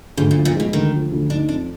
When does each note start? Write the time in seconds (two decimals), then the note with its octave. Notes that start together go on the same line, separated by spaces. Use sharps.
0.17 D2 G#2
0.31 A#2
0.36 F3
0.45 A#2
0.55 B2 G#3
0.73 D2 D#3
0.92 F3
1.12 D2
1.30 D4 D#4
1.49 F2 D4